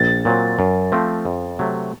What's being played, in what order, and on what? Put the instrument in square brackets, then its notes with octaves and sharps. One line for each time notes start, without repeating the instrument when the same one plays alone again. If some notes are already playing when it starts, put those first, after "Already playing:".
Already playing: [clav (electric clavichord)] A#1 [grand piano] A6
[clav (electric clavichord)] A#2 F#3 C4
F#2
F3 A3 C4
F2
C3 F#3 A3